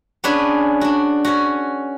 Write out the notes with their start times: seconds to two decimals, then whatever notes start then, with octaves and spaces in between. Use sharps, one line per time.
0.24 B3 C#4 D4 G#4 B4
0.81 D4 F#4
1.25 C#4 F#4